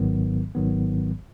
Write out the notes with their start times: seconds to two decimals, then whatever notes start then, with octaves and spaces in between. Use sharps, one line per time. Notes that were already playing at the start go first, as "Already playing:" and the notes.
Already playing: G#1 G#2 D#3 F#3 B3
0.55 G#1 G#2 D#3 F#3 B3